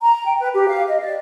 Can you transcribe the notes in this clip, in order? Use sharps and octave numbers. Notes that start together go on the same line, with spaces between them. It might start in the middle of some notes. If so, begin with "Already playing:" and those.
A#5
G5
B4
G4
F5
D#5
D5